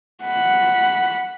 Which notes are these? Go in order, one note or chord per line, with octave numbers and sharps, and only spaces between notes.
F#5 B5